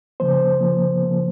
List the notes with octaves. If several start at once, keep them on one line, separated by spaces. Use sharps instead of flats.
C#3 F3 A#3 C5
C#3 F3 A#3
C#3 F3 A#3